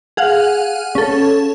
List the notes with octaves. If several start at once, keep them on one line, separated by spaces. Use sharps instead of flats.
G#4 F5 F#5
C#4 A4